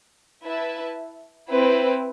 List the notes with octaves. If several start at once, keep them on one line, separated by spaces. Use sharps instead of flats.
E4 B4 E5 A5
C4 E4 B4